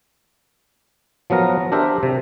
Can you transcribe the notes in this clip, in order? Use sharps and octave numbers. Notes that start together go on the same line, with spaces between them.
F3 F#3 B3 A#4 A#5
D4 G4 A#4 C5 E5
C3